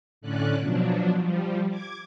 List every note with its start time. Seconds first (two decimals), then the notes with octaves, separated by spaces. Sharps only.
0.21 A2 D3 C#4 D5 F#6
0.59 B2 F3 F#3 D4
1.19 F3 G3
1.69 D6 G#6